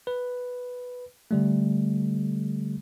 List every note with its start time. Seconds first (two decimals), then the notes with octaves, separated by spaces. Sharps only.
0.07 B4
1.31 D3 G3 A3